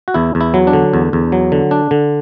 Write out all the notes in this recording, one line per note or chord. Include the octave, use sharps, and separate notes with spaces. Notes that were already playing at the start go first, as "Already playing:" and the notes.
F#4
E2 E4
E2
E4
F#3
D4
D3
E2
E2
F#3
D3
D4
D3